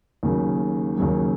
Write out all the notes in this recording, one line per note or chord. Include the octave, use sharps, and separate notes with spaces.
D#2 C#3 F#3
D#2 C#3 F#3